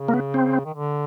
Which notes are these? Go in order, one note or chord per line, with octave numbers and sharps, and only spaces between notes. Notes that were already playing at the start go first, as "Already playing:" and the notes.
Already playing: C#3
A#3
B3
C4
D#3
D3